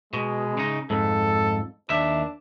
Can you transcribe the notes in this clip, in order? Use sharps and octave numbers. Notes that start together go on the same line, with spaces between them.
B2 G#3
C#3 D#4
F2 G#2 A4
D#2 D4 E5